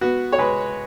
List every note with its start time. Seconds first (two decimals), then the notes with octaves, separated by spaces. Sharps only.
0.01 B3 F#4
0.32 C#5
0.38 G#3 B4